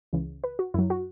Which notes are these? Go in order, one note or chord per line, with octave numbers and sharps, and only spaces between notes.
C#2 C#3 E3
B4
F#4
F#2 F#3 E4
F#4